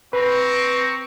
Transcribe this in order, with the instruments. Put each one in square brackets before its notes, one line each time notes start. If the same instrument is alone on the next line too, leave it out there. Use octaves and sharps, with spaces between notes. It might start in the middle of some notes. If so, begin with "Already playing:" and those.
[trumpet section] C4 A#5 C#6 [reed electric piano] B4